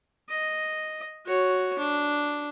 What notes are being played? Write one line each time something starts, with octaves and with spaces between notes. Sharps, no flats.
D#5
F#4 C#5
D4